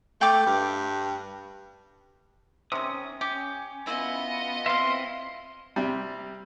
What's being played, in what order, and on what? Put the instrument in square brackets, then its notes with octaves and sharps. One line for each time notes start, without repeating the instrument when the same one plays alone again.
[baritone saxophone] A3 [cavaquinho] G5 D6
[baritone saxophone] G2
[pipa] C3 D#3 [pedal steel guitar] C#4 D#6
[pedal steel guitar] C#4 [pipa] G4
[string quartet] B3 F4 D#5 [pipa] E4
[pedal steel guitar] C4 E4 E5 [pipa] B4 F5 [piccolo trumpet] C6
[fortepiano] C3 G3